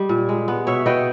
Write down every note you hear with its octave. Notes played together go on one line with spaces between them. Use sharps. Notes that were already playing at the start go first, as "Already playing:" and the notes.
Already playing: G3 D#5 G5
A#2
G#3
B3
B2 C#5 E5
B3 D#5 G5